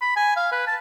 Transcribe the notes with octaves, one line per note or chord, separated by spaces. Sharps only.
B5
G#5
F5
B4
A5